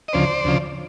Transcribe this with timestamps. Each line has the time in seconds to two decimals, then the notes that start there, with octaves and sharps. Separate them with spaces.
0.08 D#5
0.13 D2 C#3 F3 C5 D5
0.45 D2 C#3 F3